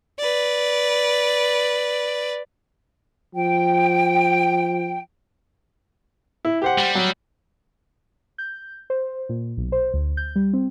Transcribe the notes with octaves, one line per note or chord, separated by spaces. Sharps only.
B4 D5
F3 G5
E4
G4 C5 F#5
G3
F#3
G6
C5
A#2
B1
C5
D2
G6
G3
C4